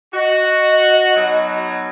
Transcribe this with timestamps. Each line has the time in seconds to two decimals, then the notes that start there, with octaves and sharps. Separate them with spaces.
0.14 F#4 D#5
1.16 B2 F#3 D#4